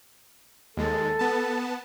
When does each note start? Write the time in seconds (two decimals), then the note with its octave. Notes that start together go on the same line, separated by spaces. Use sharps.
0.77 D#2 G#3 A4
1.19 B3 A5